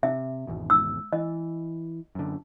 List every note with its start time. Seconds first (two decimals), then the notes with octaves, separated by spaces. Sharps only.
0.03 C3 E5
0.47 G#1 E2 B2
0.70 E6
1.13 E3 D#5
2.15 F#2 D3